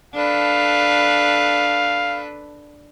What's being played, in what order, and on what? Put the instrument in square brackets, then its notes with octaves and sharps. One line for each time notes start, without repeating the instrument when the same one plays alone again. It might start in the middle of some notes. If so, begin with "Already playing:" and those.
[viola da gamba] D4 A4 B4 [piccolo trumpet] F5